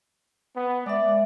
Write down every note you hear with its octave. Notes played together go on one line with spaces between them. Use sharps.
B3
G#3 D5 E5